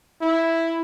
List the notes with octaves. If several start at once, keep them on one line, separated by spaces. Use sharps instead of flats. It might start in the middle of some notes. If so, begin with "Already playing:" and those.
E4